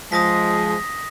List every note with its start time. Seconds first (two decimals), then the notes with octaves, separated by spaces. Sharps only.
0.12 F3 G#3 D#6 A#6 B6